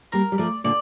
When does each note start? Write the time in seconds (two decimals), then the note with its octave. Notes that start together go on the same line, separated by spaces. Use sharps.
0.12 G3 A#3 A#4
0.32 G3
0.38 F3 A3 D5
0.64 A#2 D3 D5